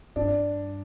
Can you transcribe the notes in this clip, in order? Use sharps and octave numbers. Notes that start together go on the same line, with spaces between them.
G2 D4